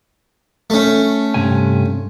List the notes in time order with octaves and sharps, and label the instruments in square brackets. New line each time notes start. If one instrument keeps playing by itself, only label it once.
[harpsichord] A3 C#4
[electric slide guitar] G2 C3 G#5